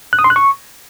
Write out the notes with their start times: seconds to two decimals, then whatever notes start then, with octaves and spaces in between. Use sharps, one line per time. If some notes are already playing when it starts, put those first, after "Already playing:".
0.13 F#6
0.19 D#6
0.24 C6
0.30 F#6
0.36 C#6